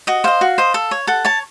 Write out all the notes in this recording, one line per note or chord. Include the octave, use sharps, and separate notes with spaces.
F#4 D#5
C5 D#5 F5
F#4
C5 D#5
A4
C#5
A4 F#5
C#5 A5